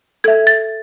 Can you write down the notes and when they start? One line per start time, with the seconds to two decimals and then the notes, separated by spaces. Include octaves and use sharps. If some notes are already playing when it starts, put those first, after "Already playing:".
0.24 A4 E5 G#6
0.47 A6